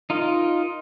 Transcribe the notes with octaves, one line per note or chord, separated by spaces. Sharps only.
D#4 F4 A#4 D#5